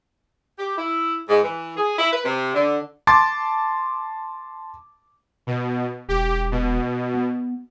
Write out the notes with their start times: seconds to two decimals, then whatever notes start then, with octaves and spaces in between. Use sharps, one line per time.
0.59 G4
0.77 E4
1.29 G#2
1.43 E3
1.77 G#4
1.98 E4
2.12 B4
2.24 C3
2.54 D3
3.07 A5 C6 D6 A6
5.47 B2
6.09 E1 G4
6.52 B2
7.14 B3